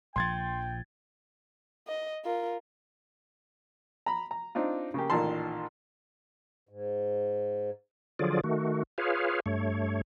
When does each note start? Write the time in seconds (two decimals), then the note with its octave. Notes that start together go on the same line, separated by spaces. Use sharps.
0.16 A#1 F3 G5 C6 G#6 A6
1.88 D#5
2.24 F4 A#4
4.06 A#5 B5
4.31 A#5
4.55 C4 D4 D#4 F4
4.94 C#3 A#3 G4
5.10 A1 A#2 D#3 A#4 A5 C6
6.69 G#2
8.19 D3 F3 F#3 F4 G#4 D5
8.44 D#3 A3 F#4
8.98 F4 G#4 B4 C#5 F5
9.46 G2 A3 C#5